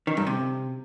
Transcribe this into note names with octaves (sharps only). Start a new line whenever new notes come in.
D#3
G2
C3